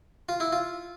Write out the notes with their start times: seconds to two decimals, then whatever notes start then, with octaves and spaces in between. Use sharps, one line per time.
0.29 F4
0.40 E4
0.52 F4